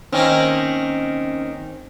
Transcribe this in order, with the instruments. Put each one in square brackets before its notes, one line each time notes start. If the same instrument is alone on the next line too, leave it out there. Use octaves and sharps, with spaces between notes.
[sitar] D#3 A#3 [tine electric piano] C4 C#4